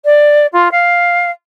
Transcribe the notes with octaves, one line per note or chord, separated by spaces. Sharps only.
D5
F4
F5